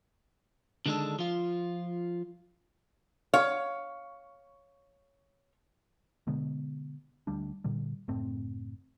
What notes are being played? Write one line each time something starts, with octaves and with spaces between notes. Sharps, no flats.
D3 D#3 G#3 C4 D4 A4
F3 F4
C#5 F5
B2 D3 G#3 B3
D2 G3 D4
A#2 D3 G3
F#1 A2 C4